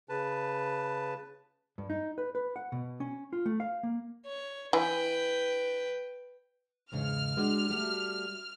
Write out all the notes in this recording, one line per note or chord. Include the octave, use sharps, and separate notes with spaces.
C#3 B4 A5
G2
D#4
B4
B4
F#5
B2
C#4
F4
A3
F5
A#3
C#5
E3 B4 G5
E2 G#2 C#3 F6
G#3 D4 F#4
G3 A3 F#4